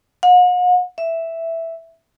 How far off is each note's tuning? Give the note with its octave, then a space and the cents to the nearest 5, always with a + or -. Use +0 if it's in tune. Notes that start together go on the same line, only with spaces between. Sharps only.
F#5 -45
E5 +0